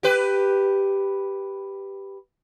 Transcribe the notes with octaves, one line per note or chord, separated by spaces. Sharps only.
G4 B4